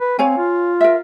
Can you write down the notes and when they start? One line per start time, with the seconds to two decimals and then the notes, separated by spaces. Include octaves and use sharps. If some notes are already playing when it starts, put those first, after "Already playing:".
0.01 B4
0.19 C4 C#5 F5 G#5
0.38 F4
0.81 A#4 E5